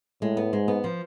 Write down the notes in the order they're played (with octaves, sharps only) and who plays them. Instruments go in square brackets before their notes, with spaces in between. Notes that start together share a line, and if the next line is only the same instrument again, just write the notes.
[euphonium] A2 [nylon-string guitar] G#3
[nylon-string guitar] B3
[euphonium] G#2 [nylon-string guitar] G#3
[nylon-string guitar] B3
F3